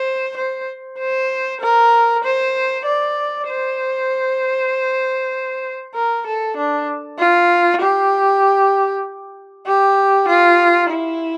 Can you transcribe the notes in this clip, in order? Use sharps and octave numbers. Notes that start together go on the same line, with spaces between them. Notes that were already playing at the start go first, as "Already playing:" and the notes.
Already playing: C5
C5
C5
A#4
C5
D5
C5
A#4
A4
D4
F4
G4
G4
F4
E4